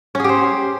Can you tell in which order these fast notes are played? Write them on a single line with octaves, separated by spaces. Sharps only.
C#4 G#4 G4 C5